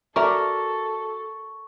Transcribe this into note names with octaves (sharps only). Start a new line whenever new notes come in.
F#4 A4 A#4 D5 E5 A#5 C#6